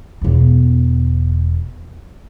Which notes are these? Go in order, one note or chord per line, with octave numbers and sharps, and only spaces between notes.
E1 B3